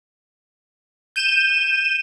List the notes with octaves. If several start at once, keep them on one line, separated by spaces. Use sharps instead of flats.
G6 D#7 E7